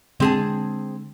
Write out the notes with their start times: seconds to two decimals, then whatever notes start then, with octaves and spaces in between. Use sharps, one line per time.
0.20 D3 G#3 C4 G#4 A5